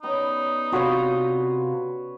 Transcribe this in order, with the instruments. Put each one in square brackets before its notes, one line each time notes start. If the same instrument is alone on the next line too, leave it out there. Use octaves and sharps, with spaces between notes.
[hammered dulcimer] G3 B3 C#4 [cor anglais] D#4
[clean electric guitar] C3 F4 [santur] F#4 B4 C#5